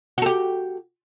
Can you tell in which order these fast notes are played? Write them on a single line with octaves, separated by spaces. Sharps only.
F#4 A4 G4